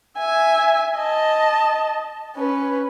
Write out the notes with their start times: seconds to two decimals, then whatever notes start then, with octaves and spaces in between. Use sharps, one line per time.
0.18 E5 G#5
0.97 D#5 A5
2.37 C#4 B4